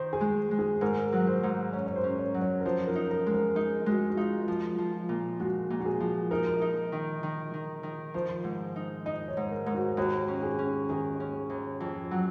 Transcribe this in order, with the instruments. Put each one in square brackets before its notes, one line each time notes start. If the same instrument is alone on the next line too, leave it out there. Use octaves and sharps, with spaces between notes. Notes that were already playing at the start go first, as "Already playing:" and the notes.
Already playing: [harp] D#3 [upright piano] C5
[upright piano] G#4
[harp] G#3
G#3
[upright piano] G#4
[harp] G#2 [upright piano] A#4
[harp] F#3
[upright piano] C5
[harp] G#2
[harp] C#4 [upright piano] C#5
[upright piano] C#5
C5
[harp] C#4
[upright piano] C#5
[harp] F#3
[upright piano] C#5
A#4
[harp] F3 [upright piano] C5
[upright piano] A#4
[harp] D#4
[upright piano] A#4
[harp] G#3
[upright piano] A#4
[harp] D#4 [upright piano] G#4
[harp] G#3 [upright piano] F#4
[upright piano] F#4
[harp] D#4 [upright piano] F4
[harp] F3
F3
A#2
[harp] G#3 [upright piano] F#4
[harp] A#2
[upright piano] F#4
G#4
[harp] F3
[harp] D#4 [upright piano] A#4
[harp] D#4
D#3
D#3
D#3
D#3
[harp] F3 [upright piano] C5
[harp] G#2
D#4
[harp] D#4 [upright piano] D#5
[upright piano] C#5
[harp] G#2
[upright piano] A#4
[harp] G#2
[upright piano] F#4
[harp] D#2 [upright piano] F#4
[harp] C#4
[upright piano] G#4
[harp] C#4
[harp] D#3 [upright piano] G#4
[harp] C#4
D#2
F2
F#3